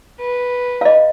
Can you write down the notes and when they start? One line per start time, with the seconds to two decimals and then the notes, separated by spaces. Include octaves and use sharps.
0.20 B4
0.81 D#5 F5